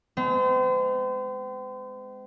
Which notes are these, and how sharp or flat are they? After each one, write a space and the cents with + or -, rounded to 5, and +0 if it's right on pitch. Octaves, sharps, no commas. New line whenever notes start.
G#3 +0 C4 -40